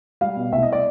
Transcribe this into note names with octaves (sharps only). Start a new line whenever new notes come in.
G3 F5
B2
C2 E5
D#5
D5